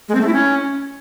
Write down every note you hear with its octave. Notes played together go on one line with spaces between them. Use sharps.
G#3
C4
A3
E4
C#4